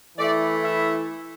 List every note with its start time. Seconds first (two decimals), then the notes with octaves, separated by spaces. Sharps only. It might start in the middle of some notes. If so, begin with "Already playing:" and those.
0.18 E3 A3 E4 D5
0.64 E5